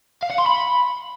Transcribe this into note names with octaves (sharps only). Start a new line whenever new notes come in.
F5
F#5
C6
B5